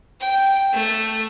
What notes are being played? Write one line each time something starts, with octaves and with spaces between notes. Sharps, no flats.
G5
A3